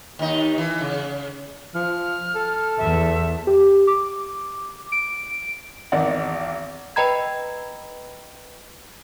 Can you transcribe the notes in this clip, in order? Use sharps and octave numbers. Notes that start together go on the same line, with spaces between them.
D#2 D#4
E3
C#3
F3 F6
A4
E2 E5
G4
D6
D7
G#1 E2 D#3 D5 F#5
B4 D#5 G5 A#5 B5 G#6